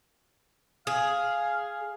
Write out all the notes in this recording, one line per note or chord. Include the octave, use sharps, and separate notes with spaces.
G#4 F5